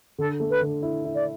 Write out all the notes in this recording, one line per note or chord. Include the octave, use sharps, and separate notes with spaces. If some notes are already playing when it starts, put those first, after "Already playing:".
D3 A4
A3
B4
D3
E4
E4
D5